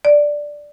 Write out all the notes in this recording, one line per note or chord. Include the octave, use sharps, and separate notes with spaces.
D5